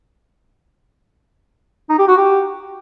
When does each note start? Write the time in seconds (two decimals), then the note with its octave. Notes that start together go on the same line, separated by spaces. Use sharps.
1.89 D#4
1.99 G4
2.08 F#4
2.17 G4